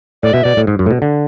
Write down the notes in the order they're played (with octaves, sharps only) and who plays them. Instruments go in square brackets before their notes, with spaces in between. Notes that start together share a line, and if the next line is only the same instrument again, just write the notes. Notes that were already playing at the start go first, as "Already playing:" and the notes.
[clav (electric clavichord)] A2 [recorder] D5
[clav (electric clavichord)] B2 [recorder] E5
[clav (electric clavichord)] B2 [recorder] D5
[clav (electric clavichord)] A2
G#2
F#2
A2
B2
D3